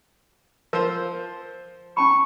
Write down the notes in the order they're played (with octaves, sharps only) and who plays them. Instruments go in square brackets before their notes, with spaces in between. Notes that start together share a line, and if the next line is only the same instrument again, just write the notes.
[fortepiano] F3 C5 [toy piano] A#4
[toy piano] C#4 A5 B5 [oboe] C#6